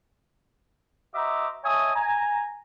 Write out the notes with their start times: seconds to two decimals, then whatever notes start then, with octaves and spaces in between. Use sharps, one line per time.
1.14 F#4 C5 D#5 E5 A#5 D6
1.64 C#5 D#5 E5 G#5 A5 D#6
1.95 G#5 A#5